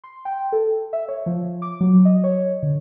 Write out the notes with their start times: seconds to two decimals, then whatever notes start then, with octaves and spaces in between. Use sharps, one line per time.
0.04 C6
0.25 G5
0.52 A4
0.93 E5
1.08 C#5
1.26 F3
1.62 D6
1.81 F#3
2.05 D#5
2.24 C#5
2.63 D3